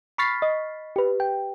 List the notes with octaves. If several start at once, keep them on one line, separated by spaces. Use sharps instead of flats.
B5 C#6 F6 A6 B6 C7
D#5
G4 B4
G5